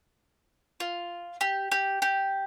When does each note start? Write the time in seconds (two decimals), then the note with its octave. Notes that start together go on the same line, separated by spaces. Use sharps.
0.80 F4
1.41 G4
1.72 G4
2.02 G4